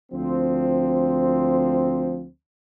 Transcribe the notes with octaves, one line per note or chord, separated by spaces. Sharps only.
D2 F3 C4